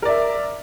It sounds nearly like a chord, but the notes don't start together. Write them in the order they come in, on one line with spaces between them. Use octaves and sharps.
A#4 D5 E5